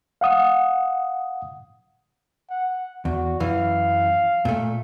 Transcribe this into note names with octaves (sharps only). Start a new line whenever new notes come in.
F5 F#5 D#6
F#5
E2 F#4
F#2 E3 F5
A#2 A3